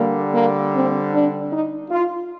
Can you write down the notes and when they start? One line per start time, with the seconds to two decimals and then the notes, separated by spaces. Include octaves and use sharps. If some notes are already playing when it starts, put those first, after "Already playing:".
Already playing: D3 G3 A#3
0.33 A#3
0.72 C4
1.12 D4
1.50 D#4
1.90 F4